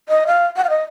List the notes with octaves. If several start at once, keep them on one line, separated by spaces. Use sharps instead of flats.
D#5
F5
F#5
F5
D#5